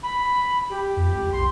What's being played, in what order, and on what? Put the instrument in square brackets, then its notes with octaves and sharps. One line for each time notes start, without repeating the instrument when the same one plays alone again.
[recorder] B5
G4
[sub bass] F2
C#2
[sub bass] B1 [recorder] C6